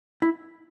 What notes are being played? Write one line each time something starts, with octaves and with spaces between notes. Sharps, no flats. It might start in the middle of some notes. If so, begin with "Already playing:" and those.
E4